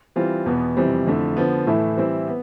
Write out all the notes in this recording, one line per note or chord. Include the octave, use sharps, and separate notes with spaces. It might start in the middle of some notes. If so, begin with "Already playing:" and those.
E3 G3 C4 F4
E2 B2 B3
F2 C3 E3 G3 C4
F2 D3 A3 E4
D3 F3 B3
A2 E3 A3 E4
E3 G3 C4 E4
B3